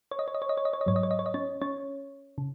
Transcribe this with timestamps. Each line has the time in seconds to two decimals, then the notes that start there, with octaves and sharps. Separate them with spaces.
0.11 C#5
0.19 D#5
0.28 C#5
0.34 D#5
0.42 C#5
0.49 D#5
0.57 C#5
0.65 D#5
0.73 C#5
0.81 D#5
0.86 G#2 F#3 C#5
0.96 D#5
1.03 C#5
1.11 D#5
1.19 C#5
1.26 D#5
1.34 C#4 C#5
1.61 C#4 C#5
2.38 C#3